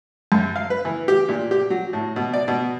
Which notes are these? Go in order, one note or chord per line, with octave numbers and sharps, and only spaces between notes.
F#2
F5
B4
E3
G4
A#2
G4
F#3
A2
B2
D5
B2